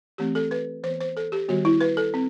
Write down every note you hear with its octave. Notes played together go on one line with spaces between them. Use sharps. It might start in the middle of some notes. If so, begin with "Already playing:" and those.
E3 A3 C4 G4
A4
B4
E3 B3 C5
C5
A4
G4
D#3 G3 B3 F#4
E4
B4
A4
C4